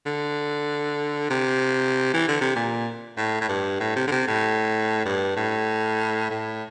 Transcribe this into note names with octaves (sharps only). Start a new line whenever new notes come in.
D3
C3
E3
D3
C3
A#2
A2
A2
G2
A2
C3
D3
C3
A2
G2
A2
A2